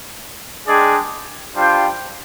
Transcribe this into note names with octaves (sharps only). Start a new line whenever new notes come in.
G#3 D4 G#4 D5 G5
G3 D4 F4 C5 G5